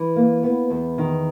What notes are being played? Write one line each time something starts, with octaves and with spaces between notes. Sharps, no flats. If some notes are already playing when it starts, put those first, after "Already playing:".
Already playing: E3
A#3
B3
E2
D#3